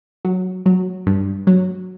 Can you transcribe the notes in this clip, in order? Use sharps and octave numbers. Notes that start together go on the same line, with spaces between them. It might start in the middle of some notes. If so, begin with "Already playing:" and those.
F#3
F#3
G2
F#3